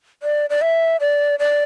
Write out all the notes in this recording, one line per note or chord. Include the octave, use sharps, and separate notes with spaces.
D5
D5
E5
D5
D5